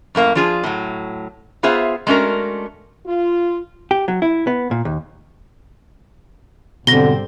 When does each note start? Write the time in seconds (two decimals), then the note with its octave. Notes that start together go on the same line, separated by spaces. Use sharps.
0.15 F#2 A2 A#3 F5
0.35 F3 D4 F4 G#4
0.64 A2 F#3
1.63 B3 F4 G#4 C5 E5
2.07 G#3 A3 C#4 D4 F#4 A#4
3.06 F4
3.91 G4
4.08 F#3
4.22 E4
4.47 B3
4.71 A#2
4.85 D#2
6.87 G#1 B2 D3 G3 C4 A#6 G7